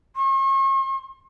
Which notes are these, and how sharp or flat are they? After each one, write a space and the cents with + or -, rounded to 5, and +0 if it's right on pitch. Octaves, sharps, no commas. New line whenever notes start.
C#6 -45